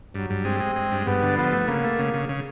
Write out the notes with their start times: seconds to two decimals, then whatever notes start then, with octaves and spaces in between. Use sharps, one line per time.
0.14 G2 F#3
0.30 G2
0.45 G#3 C4
0.60 G#3
0.76 G#3
0.92 G2
1.06 G2 B3
1.23 D3
1.37 F3 B3
1.52 A3
1.68 C#3 A#3
1.84 A3
1.99 C#3
2.14 C#3
2.29 C#3